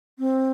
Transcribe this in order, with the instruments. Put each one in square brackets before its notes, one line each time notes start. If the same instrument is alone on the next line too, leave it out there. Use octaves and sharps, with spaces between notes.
[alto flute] C4